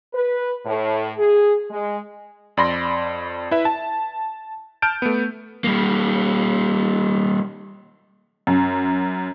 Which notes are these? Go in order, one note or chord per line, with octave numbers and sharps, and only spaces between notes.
B4
A2
G#4
G#3
F2 D5 B5 C6 A#6
E4 B4 E5
A5
A5 F6 G6 D7
A3 B3
G3 A#3
F#2